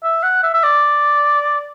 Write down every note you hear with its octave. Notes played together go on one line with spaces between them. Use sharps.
E5
F#5
E5
E5
D5